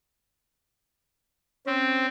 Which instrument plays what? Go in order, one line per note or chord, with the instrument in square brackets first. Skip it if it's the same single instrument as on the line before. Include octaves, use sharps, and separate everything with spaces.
[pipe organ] C4 [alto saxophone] C#4